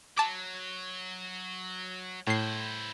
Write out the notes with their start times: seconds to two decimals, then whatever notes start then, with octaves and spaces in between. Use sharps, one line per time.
0.17 F#3 A5 D6
2.27 A2 E4 C5 C7